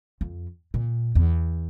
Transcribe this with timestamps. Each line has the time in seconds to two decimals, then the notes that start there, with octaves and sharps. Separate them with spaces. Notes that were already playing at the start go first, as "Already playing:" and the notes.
0.21 F2
0.74 A#2
1.15 E2